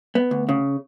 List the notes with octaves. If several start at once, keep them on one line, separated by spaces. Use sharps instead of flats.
B3
D2
C#3